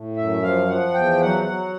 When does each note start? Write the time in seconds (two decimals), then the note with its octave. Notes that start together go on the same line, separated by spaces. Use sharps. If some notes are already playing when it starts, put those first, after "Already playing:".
Already playing: A2
0.16 F#2 E5
0.42 F3 F5
0.68 F3 F#5
0.94 E2 G5
1.21 F#3 F#5
1.47 F#3